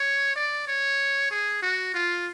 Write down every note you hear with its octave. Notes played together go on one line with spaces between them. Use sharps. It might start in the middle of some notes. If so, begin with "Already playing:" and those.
Already playing: C#5
D5
C#5
G#4
F#4
F4